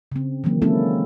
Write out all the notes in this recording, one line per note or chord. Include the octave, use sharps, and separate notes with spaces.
C#3 C4
D#3 E3 F#3 A#3
G#3 A#3 C4 C#4 E4 A4